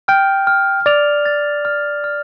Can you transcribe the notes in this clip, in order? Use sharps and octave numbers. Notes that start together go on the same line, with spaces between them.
G5 F6
F6
D5 F7
A6
F6
F6